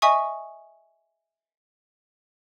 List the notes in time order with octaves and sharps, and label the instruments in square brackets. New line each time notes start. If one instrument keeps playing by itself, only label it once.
[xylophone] D#5 E5 G#5 C#6 D#6